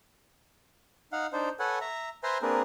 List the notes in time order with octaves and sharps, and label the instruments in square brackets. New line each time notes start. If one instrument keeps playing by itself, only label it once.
[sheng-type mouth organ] D#4 F5 F#5
D4 D#4 C5
A4 B4 C#5 F#5 G#5
E5 A#5
B4 C5 E5 G#5 A#5 C6
A#3 C4 D4 G#4 A#4 B4